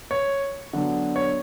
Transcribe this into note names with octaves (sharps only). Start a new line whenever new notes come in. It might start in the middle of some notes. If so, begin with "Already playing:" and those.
C#5
D3 F#3 B3 D4
C#5